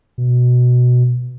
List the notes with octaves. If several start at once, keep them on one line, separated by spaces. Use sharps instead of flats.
B2